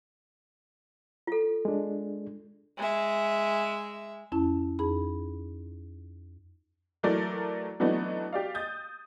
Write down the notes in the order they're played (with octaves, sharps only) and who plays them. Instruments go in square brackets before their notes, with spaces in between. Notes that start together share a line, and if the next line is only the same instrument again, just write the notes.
[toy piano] F4 A4
[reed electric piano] G#3 D4
[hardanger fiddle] G#3 E5
[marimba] F2 C#4 E4 A5
F2 D#4 G#4 B5
[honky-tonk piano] E3 F#3 A3 A#4 D5
E3 F#3 A3 B3 D4 D#4
G4 D5 F5
D#6 G6 A6